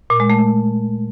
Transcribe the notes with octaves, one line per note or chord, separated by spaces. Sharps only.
A#2
G#3
A3